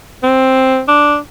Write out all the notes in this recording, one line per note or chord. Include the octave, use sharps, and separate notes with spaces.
C4
D4